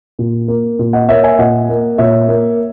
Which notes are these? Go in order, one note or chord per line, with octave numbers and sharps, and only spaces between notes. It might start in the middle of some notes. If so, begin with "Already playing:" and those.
A#2
A#3
A#2
D#5 F#5
A#3 C#5 E5
E5 G#5
A#2 D#5 F#5
A#3
A#2 C#5 E5
A#3